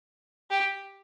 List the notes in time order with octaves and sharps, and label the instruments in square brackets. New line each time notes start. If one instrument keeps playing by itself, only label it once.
[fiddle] G4